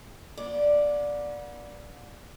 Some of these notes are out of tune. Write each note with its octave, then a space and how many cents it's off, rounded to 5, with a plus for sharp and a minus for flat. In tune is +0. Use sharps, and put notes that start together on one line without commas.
B3 -40 D5 +0